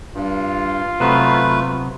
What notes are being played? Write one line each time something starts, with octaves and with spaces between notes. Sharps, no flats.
G2 F4
C3 F#3 A3 B3 B4